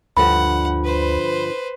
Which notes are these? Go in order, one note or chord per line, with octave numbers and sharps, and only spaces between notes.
D2 G2 D3 F3 F#5 B5
B4 C5